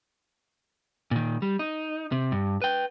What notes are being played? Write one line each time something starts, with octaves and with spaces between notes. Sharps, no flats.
A#2 D#3
G3
D#4
C3
G2
B4 G5